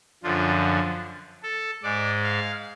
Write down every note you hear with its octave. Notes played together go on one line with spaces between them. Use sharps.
F#2 D3 F3 F4
A4
G#2 G#3 D5
F5